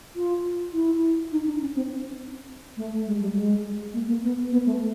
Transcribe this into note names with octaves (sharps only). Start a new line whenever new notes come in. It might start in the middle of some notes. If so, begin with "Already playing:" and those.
F4
E4
D#4
D4
C#4
C4
A3
G#3
G3
G#3
A#3
A#3
B3
B3
A3